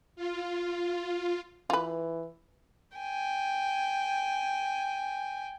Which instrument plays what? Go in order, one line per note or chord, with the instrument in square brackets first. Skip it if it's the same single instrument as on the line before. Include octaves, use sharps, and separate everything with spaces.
[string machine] F4
[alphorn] E3 [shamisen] F4 B4
[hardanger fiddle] G5 G#5